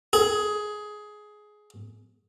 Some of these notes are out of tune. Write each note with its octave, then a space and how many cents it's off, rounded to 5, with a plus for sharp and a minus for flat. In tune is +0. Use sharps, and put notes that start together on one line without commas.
G#4 +15